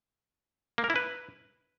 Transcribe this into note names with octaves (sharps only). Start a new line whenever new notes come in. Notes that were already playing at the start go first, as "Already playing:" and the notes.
A#3
A#4
E4
B4